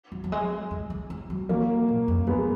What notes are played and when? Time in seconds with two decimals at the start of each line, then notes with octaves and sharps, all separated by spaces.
0.12 F#3
0.24 F#3
0.32 G#3
0.71 G#3
0.90 G#3
1.10 G#3
1.30 F#3
1.49 E3 F#3 A#3
1.88 A#2
2.08 F#2
2.27 F#2 G#3 B3